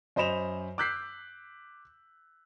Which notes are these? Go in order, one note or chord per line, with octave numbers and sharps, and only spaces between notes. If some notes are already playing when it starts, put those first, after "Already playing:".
F#2 C5 D#5 B5 E7 F7
D6 E6 F#6 G6 B6 C7